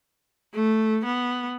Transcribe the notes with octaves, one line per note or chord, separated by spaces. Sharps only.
A3
B3